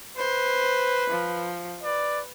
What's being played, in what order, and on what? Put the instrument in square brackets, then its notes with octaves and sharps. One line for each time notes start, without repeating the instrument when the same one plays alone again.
[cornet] B4 [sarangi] C5
[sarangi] F3
[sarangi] B4 [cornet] D5